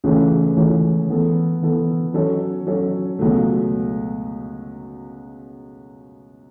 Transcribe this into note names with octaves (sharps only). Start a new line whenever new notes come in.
C#2 C#3 E3 A3 C#4
C#2 C#3 E3 A3 C#4
E3 B3 A4
E3 B3 A4
F#3 C#4 A4 C#5
F#3 C#4 A4 C#5
C#2 B2 F#3 A3